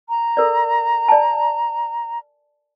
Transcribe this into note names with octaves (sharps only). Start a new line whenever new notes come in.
A#5
A4 A#4 D5
D5 G#5 A5